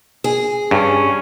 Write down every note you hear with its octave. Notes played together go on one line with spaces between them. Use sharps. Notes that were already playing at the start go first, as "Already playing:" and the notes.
G#4
G2 C#4